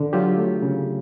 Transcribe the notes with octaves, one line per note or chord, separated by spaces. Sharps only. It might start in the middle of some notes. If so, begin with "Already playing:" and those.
Already playing: D3
F#3 F4 G4
A3
C#3